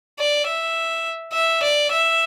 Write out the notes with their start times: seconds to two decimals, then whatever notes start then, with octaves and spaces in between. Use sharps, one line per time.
0.19 D5
0.47 E5
1.33 E5
1.63 D5
1.92 E5